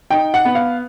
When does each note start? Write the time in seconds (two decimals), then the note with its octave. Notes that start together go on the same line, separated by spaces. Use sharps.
0.11 D#4 G5
0.34 F#5
0.45 B3
0.55 F5